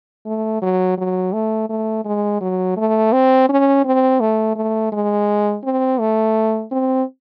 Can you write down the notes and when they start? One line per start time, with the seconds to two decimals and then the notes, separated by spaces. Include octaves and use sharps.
0.26 A3
0.62 F#3
0.98 F#3
1.33 A3
1.70 A3
2.05 G#3
2.41 F#3
2.77 A3
3.13 C4
3.49 C#4
3.85 C4
4.20 A3
4.56 A3
4.92 G#3
5.64 C4
6.00 A3
6.72 C4